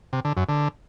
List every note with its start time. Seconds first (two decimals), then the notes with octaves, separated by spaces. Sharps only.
0.13 C3
0.25 D3
0.37 F#2
0.49 D3